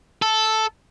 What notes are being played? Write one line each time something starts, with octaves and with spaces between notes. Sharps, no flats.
A4